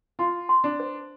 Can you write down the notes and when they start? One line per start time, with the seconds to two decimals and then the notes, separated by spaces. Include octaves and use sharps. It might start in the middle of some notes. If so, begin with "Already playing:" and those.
0.19 F4 C6
0.49 C6
0.64 D4
0.80 C5